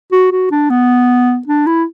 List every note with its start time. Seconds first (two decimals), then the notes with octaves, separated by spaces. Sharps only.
0.12 F#4
0.31 F#4
0.51 D4
0.70 B3
1.47 D4
1.67 E4